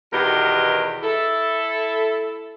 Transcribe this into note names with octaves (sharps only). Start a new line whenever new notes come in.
E2 B2 D#3 G4 A#4
E4 A4